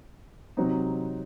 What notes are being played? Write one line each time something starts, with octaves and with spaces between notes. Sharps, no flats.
C3 F#3 C4 D#4